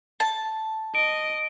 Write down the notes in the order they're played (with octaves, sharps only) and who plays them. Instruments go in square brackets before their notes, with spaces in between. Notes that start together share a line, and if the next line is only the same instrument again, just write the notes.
[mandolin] A5
[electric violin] D#5 [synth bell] D7